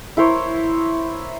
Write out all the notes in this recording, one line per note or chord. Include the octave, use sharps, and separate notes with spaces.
E4 A#4 C5 C#5